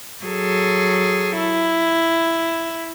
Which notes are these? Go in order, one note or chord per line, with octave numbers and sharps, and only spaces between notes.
F#3 G#4 A4
E4